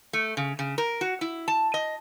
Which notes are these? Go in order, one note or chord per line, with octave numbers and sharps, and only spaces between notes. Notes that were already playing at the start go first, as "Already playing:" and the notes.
A3
C#3
C#3
A#4
F#4
E4
A5
D#5